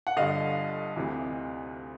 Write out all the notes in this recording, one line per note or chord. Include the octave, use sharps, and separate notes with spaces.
F#5
G1 G2 D3 D#5 F5
D2 C3 E3